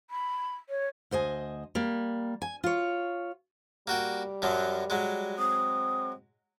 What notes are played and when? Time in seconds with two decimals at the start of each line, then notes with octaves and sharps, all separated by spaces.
0.10 B5
0.69 C#5
1.11 D2 C5 D#5 G#5
1.75 G3 A#3
2.42 G#5
2.64 F4 C#5
3.87 G3 A#3 F#4 G5
4.42 F#2 F3 F#3
4.90 F#3 G#3
5.39 C4 D#6